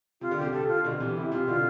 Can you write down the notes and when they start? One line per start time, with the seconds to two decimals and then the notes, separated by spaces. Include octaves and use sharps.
0.21 C3 F4
0.31 D3
0.37 C3 G4
0.53 C3 A4
0.68 F4
0.84 B2 D3
1.00 C3 E3
1.16 C3 E4
1.32 C3 F4
1.47 B2 D3 F4